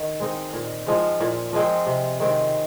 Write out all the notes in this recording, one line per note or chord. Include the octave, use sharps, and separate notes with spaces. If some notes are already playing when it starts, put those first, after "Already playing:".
Already playing: D#3
G#3 C4 D#4
A#2
F3 G#3 C4
A#2
F3 G#3 C4
C3
D#3 G#3 C4